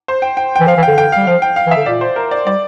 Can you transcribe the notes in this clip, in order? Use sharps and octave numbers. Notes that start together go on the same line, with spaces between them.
C5
G5
G5
G5
E3
F3 F5
E3
D3 G5
D3 G5
G3 F5
F3 F5
G5
F5
E3
E5
D3
A#2 D5
C5
A#4
D5
G3 D5